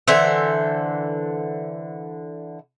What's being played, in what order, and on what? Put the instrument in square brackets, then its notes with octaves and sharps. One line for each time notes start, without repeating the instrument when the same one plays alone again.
[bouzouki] D3 E3 C5 E5